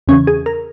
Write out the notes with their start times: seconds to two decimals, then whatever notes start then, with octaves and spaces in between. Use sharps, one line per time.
0.08 E2 C#3 E3 C#4
0.27 G#4
0.46 A#4